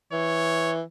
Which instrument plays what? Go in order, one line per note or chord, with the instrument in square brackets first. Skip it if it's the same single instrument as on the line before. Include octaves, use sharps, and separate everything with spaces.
[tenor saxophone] E3 [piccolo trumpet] C#5